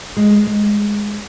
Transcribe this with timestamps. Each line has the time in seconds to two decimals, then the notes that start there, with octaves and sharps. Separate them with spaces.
0.17 G#3
0.47 G#3